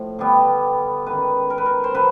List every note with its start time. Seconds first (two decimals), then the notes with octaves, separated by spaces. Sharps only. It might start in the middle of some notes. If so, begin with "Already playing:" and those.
Already playing: A2 F3
0.19 D3 G3 B3
1.06 D#3 G#3 C#4 B4
1.50 A#4
1.58 B4
1.66 A#4
1.84 C5
1.95 D3 F#3 B4